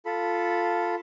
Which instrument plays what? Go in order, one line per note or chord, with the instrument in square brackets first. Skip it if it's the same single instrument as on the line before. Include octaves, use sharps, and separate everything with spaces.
[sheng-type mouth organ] F4 A4 B5